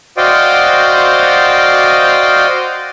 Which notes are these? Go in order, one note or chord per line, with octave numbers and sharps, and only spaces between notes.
F#4 C5 D5 D#5 F5 G5